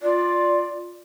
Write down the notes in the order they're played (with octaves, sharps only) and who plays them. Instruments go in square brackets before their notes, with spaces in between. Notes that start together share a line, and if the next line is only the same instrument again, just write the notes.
[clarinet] F4 [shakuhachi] D5